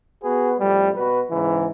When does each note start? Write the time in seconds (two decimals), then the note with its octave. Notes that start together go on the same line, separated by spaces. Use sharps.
0.23 B3 F#4 G#4 B4
0.59 F2 A2 G3
0.96 B2 F#4 B4
1.31 G#2 C#3 E3